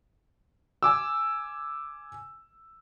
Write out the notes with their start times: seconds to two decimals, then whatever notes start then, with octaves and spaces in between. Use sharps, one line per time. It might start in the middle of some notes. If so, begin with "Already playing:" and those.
0.83 G#5 D6 E6